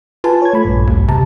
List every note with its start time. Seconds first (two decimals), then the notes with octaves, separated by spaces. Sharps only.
0.24 F4 B4 G#5 A5
0.42 C#5 G#6
0.53 A3 B5
0.65 A#1 G2
0.87 D#2
1.08 C3 A5 A#5